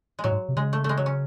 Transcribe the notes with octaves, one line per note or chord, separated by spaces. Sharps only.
G#3
A2 F#3
G#2
C3
C#3 G#3
A3
G#3 A3
F#3
C#4